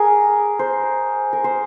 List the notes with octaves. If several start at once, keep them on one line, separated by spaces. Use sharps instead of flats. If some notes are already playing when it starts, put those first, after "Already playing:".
Already playing: G#4 A#4
C5
A#4
C5